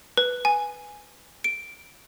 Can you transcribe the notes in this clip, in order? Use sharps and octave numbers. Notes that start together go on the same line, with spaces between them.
B4
G#5
D7